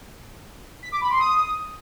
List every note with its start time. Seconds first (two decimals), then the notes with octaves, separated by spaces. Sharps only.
0.83 B6
0.92 D6
1.01 B5
1.10 C6
1.20 D#6